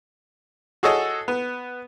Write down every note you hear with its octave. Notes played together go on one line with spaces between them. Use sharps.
F#4 G#4 A4 C#5 D#5
B3